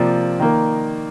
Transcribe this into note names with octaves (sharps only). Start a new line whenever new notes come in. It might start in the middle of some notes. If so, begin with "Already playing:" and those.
Already playing: C3 F3 A#3 D5
D#3 A#3